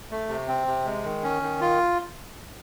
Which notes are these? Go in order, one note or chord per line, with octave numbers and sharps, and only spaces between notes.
A3
C3
C4
C3
G#3
D#3
C#4
D#3
F4